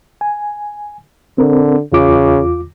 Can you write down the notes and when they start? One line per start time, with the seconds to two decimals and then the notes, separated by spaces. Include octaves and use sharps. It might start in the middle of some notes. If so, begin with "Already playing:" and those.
0.21 G#5
1.38 D3 C4 A#4
1.92 E2 C#3 F4 D6